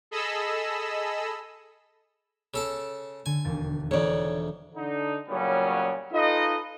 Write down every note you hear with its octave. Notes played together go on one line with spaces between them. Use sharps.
G#4 A4 D#5 B5 E6
C#3 A4 A5
D3 G#5
E1 D#2 A6
F2 G#2 E3 D4 C#5 D5
D3 D#4
A#2 C#3 F#3 G3 B3 C#4
D#4 F4 A4 B4 D#5